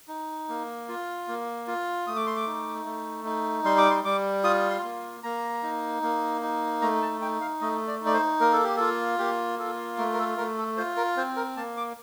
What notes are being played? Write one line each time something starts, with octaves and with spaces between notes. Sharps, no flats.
D#4
A#3
F4
A#3
F4
A3 D#6
D6
C6
D6
D#4
A3
D#4
G3 C6
D6
C6
G3 D6
F4 D#6
C6
A#3
A#3 A#5
D#4
A#3
D#4
A3 A#5
A5
D#4 G5
F5
A3 D#5
D5
D#4
D5
C5
A#3 A#4
A4
G4
F4 A4
A#3 G4
F4 A4
A3 A#4
A#4
A4
A3 A#4
A4
F4 C5
A#4
C4 C5
A#4
A#3 A5
D6